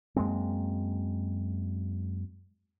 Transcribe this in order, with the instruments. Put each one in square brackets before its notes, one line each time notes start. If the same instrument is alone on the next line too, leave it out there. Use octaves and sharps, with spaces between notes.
[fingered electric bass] F#2 G#3 A#3 C4